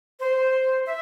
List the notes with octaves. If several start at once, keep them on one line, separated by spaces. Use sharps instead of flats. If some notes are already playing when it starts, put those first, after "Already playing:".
C5
E5